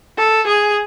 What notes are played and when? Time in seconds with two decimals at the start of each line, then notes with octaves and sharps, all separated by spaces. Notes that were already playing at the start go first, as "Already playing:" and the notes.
0.18 A4
0.47 G#4